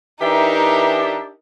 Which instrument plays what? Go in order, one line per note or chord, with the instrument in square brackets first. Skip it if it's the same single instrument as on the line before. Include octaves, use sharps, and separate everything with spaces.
[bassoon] E3 [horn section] D4 G4 E5 [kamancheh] D#4 A#4